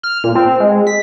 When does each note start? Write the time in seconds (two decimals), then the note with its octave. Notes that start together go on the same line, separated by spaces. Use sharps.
0.03 F6
0.24 A#2
0.35 C4
0.60 G#3
0.87 B6